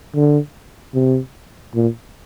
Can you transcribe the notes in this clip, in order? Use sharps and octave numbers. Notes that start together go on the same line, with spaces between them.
D3
C3
A#2